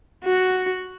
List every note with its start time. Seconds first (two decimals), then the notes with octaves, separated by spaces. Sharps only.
0.25 F#4